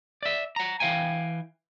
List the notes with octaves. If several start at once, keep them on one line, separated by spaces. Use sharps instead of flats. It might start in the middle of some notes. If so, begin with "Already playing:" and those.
D5 E5
F#5 A#5
E3 F5 G5 G#5